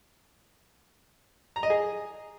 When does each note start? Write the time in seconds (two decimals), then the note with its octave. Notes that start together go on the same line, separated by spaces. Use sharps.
1.56 A#5
1.63 D#5
1.70 G#4